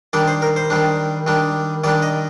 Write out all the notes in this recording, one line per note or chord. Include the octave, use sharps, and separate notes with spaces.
D#3 G3 D4 D5
C5
A#4
C5
D#3 G3 D4
D#3 G3 D4
D#3 G3 D4 D5
D#5